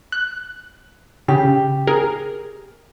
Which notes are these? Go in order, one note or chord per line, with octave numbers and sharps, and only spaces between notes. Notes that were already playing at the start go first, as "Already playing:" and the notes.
F#6
C#3 G4
G#4 A#4